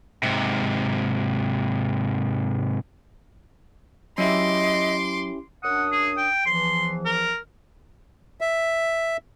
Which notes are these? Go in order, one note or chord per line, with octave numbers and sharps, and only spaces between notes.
G#2 C3
F#3 C#4 E4 G4 D#5 E5 C6 D6
F#2 D4 F#5 D#6
G#4
G5
E2 E3 F3 C6
A#4
E5